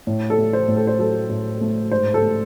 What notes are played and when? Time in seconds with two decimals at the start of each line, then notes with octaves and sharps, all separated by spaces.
0.07 A2
0.30 A4
0.38 A3
0.53 C5
0.68 A2
0.77 A4
0.87 C5
0.99 F#3 A4
1.29 A2
1.61 A3
1.91 G#2 C5
2.14 A4
2.22 A3